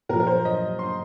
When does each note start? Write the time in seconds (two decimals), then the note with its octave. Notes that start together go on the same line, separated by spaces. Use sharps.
0.09 A#2 A#4
0.13 F3
0.20 A#4
0.27 C5
0.45 D#5
0.79 C6